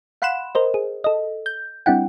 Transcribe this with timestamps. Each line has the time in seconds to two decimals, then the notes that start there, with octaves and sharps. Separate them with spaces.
0.22 F5 F#5 B5 C6 F#6 E7
0.55 A#4 C5 D#5
0.74 G#4
1.04 A4 D#5
1.46 G6
1.86 G3 C4 D4 E4 F#5 G5